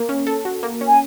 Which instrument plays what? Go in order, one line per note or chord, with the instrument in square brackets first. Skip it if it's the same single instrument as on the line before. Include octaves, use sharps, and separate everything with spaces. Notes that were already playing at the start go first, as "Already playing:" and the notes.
Already playing: [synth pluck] A#3
C#4
A4
F#4
A#3
C#4
[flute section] G#5